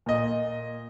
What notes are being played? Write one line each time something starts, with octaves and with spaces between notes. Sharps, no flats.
A#2 D#5